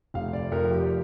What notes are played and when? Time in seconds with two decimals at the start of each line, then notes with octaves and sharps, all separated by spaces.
0.14 F1 F5
0.33 D5
0.52 F2 A#4
0.71 G4